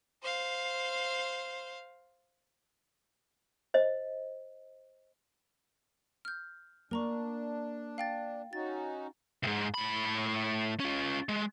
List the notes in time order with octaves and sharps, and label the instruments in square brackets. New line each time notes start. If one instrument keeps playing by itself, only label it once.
[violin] C5 F5
[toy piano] C5 D#5
[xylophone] F6 G6
[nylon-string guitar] A#3 [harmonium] D4 [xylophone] A#4 A#5 C#6
[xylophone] F5 G5 A6
[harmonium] C#4 D#4 F#4 [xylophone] A6
[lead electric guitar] C2 G#2
A2 B5
C#4 F4
G#3